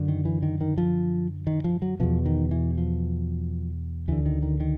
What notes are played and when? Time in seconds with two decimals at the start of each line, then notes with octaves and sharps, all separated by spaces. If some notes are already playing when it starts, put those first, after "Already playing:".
Already playing: F#2 D3
0.08 D#3
0.25 E3
0.43 D#3
0.61 D#3
0.78 F3
1.47 D#3
1.64 F3
1.82 F#3
2.00 E2 B2 F3
2.26 D#3
2.51 E3
2.78 F3
4.08 D2 D3 E3
4.26 D#3
4.43 D#3
4.60 D#3